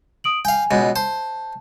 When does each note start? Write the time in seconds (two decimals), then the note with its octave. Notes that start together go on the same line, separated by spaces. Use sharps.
0.24 D#6 D7 F#7
0.45 F5 G5 G#5
0.71 C#2 B2
0.96 C5 A5